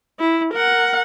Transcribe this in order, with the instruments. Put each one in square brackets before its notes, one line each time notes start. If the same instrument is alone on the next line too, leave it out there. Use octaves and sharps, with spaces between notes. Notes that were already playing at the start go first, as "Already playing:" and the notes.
[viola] E4
A#4 F#5